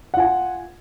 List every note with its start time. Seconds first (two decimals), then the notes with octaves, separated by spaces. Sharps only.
0.14 F#5
0.17 F4
0.20 G#5